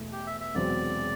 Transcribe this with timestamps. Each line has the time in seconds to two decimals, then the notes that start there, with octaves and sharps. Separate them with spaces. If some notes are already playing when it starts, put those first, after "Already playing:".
Already playing: E2 B2 A3
0.12 G4
0.27 E5
0.40 E5
0.55 E1 E2 C3 F#3 C4 D5